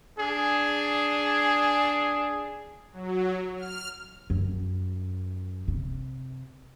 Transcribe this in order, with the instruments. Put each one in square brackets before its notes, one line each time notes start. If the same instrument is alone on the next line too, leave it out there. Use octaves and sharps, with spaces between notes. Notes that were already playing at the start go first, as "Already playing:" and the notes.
[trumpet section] D4 G#4
[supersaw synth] F#3
F6
[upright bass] F#2
C3